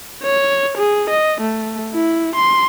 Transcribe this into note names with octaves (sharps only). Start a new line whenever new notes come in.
C#5
G#4
D#5
A3
E4
C6